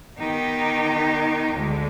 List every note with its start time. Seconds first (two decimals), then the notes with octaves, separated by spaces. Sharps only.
0.18 D#3 B3 D#4 G4
1.55 D2 D3 G#3